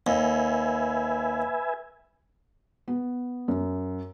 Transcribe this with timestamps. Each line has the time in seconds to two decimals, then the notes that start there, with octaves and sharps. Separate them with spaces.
0.07 D#2 B4 E5 G#5
2.88 B3
3.48 F#2